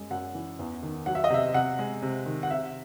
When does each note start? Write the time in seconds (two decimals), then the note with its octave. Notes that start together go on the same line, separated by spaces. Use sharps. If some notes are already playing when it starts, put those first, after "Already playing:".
Already playing: F#2 G#3
0.10 F#2 F#5
0.35 E3
0.59 E2
0.83 D#3
1.06 F#3 F#5
1.15 E5
1.24 D#5
1.30 C3 E5
1.54 C3 F#5
1.79 G#3
2.02 C3
2.26 D#3
2.43 F#5
2.50 C3 E5